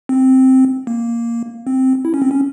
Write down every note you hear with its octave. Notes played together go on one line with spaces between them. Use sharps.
C4
A#3
C4
E4
C#4
C4
C#4